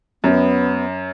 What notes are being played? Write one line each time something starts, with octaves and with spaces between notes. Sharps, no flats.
F#2 B3